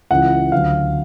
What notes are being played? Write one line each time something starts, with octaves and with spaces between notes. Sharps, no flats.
C#2 C#3 E3 F#5
D2 D3 F#3 F5